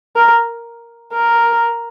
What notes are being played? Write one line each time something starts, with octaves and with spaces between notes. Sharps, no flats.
A#4
A#4